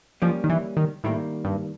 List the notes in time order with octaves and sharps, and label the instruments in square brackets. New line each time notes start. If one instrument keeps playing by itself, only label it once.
[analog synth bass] F3 [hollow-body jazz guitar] G3 A#3 C#4
[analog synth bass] D#3
E3
D#3
[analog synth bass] A2 [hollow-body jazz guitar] D#3 G3 A#3
[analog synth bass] G2